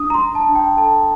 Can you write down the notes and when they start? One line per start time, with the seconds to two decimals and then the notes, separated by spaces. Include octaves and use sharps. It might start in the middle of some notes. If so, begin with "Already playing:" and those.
Already playing: D4 D#6
0.10 A#5
0.14 C6
0.21 D4
0.35 A5
0.49 D4
0.55 G5
0.77 A4 A5